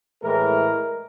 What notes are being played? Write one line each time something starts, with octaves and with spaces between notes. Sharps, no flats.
A2 E3 G#3 A#4